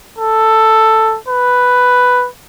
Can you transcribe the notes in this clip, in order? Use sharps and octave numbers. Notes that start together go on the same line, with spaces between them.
A4
B4